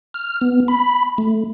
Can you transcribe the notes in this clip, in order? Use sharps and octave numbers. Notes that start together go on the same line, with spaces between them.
F6
B3
B5
A3